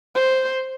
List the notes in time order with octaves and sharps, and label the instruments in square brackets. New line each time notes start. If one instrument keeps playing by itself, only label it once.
[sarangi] C5